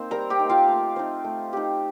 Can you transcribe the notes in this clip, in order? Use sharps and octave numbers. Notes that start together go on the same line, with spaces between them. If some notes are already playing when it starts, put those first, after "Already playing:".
Already playing: A#3 C4 D#4 C5
G3 A#4 A#5
G4 G5
A#3 D#4
F4 F5
A3
C4 D#4
A3
C4 D#4 G4